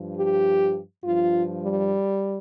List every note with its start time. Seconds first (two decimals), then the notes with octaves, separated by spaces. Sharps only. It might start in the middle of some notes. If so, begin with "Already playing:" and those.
Already playing: G2 F3
0.16 G4
1.02 G2 F3 F4
1.61 G3